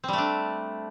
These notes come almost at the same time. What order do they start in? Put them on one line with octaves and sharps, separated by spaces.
C4 G3 A3 D4